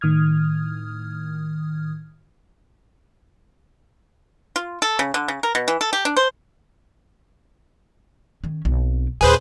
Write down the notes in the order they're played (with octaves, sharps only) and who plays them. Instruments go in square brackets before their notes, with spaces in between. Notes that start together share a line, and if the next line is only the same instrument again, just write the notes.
[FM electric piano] A2 D#3 D#6 F6 G#6
[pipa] F4
A4
C#3
D3
C#3
A#4
B2
E3
A4
G4
D4
C5
[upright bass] D#3 C#4
B1 C4
[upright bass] D#2 A#2 [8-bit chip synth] G#4 B4 C5